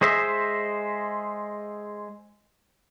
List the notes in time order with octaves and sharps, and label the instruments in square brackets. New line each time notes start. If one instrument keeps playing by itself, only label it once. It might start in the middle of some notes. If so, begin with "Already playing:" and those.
[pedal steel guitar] G#3 G#4 C5 D#5 E5